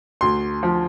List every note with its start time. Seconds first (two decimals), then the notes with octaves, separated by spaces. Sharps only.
0.21 D2 C6
0.63 F3